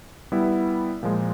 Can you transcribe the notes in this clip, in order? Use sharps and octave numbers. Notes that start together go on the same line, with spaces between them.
G3 B3 E4
A#2 F3 G#3